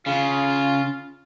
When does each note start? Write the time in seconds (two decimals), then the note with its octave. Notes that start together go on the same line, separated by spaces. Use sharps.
0.06 C#3 F4